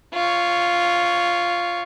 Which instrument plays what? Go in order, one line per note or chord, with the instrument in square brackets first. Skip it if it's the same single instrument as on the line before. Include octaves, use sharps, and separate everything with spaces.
[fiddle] F4 C#5